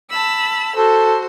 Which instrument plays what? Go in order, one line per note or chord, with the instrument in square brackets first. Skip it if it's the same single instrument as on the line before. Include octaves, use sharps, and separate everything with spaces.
[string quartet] A5 B5 E6
[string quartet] F#4 C5 [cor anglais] A4